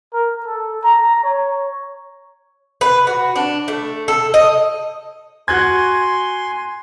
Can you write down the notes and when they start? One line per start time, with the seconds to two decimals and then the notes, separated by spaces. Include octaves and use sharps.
0.13 A#4
0.45 A4
0.84 A#5
1.24 C#5
2.81 B4
3.07 F#4
3.36 D4
3.68 A3
4.08 A4
4.34 D#5
5.48 F#4 G#5 C6 F#6 G#6